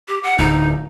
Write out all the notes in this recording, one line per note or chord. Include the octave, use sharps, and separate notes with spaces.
G4
F#5
D1 D2 D#4